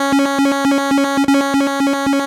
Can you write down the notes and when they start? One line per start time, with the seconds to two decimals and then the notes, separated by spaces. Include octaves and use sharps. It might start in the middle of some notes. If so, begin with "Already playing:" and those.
Already playing: C#4
1.28 C#4